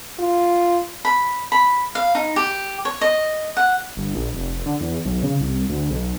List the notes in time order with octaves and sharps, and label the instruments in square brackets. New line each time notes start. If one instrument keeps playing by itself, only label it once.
[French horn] F4
[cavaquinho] B5
B5
F5
D#4
G4
C#5
D#5
F#5
[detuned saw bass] G1
A#1
F1
D3
E2
B1
C#3
C2
D2
B1